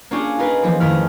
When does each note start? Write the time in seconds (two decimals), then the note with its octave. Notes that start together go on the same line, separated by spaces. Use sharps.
0.11 A#3 C#4 D4 F4 G4 G#4
0.39 D#4 F4 G#4 A#4 B4
0.63 E3 F3 A#3 D#4
0.80 F2 D#3 A3 E4 G#4 F6